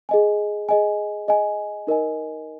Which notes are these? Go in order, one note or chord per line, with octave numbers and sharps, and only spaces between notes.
G#4 D#5 G#5
G#4 D#5 G#5
G#4 D#5 G#5
D#4 A#4 D#5 G#5